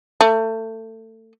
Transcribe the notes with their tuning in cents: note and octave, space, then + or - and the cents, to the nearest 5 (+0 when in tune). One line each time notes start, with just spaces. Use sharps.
A3 +25